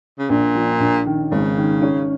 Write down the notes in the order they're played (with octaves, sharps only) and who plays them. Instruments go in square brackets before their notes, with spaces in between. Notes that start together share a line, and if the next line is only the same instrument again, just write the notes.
[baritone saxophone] C#3
[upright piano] A#1 [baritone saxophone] A#2
[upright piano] F3
A#1
D#3
[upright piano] G#1 [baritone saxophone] C#3
[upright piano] D#3
C#4